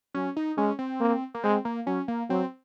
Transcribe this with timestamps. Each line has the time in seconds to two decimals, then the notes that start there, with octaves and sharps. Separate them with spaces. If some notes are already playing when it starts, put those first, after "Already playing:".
0.15 F#3 C#4
0.37 D#4
0.58 G#3 C#4
0.79 C4
1.00 A#3
1.34 A#3
1.44 G#3 C4
1.65 A#3
1.87 F#3 C#4
2.08 A#3
2.30 F#3 C4